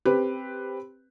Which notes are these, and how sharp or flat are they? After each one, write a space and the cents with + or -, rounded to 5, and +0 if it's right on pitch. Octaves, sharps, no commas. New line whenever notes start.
C4 +0 G4 +10 B4 +0